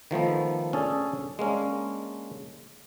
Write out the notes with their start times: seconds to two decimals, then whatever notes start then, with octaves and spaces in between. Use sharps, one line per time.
0.11 D#3 F3 A3 B3
0.73 C#4 D4 G#4 A4
1.39 G#3 A#3 C#4 D4